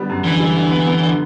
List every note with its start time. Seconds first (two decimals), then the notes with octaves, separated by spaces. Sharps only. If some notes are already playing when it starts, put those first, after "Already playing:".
Already playing: D3 G3 B3
0.10 F#2
0.24 D3 E3
0.40 G3
0.57 D3
0.71 B3
0.87 B3
1.03 D3